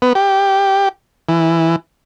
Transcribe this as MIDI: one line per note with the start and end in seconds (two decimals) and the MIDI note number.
0.02 0.13 59
0.15 0.89 67
1.29 1.76 52